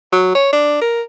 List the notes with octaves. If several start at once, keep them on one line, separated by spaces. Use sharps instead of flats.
F#3
C#5
D4
A#4